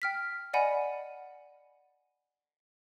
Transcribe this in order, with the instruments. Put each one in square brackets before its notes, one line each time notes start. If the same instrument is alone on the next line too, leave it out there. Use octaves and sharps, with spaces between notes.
[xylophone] G5 F6 B6
D5 D#5 F#5 G#5 B5